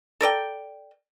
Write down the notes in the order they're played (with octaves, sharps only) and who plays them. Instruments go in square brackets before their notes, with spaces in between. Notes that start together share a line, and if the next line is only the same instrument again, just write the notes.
[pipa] A4 A#4 D5 G5